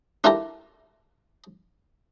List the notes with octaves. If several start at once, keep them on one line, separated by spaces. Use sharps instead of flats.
D4 E4 F4 G4 A4 A#4